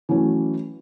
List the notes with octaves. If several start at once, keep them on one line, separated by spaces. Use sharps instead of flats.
E3 F#3 A3 C#4